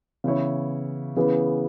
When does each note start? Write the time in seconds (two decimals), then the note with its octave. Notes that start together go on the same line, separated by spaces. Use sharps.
0.24 C#3 E3 B3 E4 C#5
1.16 C#3 E3 B3 G#4